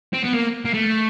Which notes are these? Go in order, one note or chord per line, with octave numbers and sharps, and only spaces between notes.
C4
B3
A#3
A#3
A3